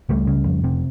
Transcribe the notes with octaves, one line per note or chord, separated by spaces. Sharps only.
C#2 G3 A3
C#3
F2
C3